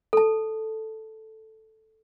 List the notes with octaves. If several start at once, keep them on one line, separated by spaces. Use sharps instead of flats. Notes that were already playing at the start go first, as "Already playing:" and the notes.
A4 A5